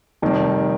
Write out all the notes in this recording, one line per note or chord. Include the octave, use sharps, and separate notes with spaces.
F1 F2 D#3 G3